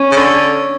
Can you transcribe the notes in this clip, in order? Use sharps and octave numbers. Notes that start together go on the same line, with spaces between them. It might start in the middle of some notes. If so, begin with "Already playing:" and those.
Already playing: C#4
C#3
D3